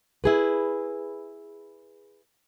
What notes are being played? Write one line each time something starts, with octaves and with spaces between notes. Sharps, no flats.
E4 G#4 B4